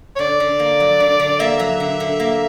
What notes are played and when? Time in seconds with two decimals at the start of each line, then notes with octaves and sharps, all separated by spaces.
0.16 C#5
0.19 D3 D5
0.40 D3
0.59 A#3
0.80 F#3
1.00 D3
1.20 D3
1.40 A#3 E5
1.59 F#3
1.80 D3
2.00 D3
2.20 A#3